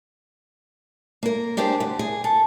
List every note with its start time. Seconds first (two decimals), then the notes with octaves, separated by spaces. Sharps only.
1.23 A#3 A#4
1.57 D4 G4 G#4 A#4 C5
1.80 D2
1.99 G#4
2.24 A4